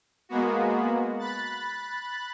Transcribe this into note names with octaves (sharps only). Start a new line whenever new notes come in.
G#3 A#3 B3 F#4
B5 F#6 A6